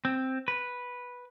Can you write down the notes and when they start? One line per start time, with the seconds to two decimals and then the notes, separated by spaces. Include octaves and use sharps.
0.05 C4
0.48 B4